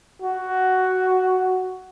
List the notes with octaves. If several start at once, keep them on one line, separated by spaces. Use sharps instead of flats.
F#4